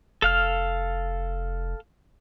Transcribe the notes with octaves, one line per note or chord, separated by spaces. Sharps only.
F1 A4 F5 F6